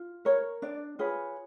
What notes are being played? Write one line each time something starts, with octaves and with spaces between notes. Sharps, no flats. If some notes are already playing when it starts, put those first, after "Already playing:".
Already playing: F4
A#4 C#5
D4 D5
F4 G#4 B4 C#5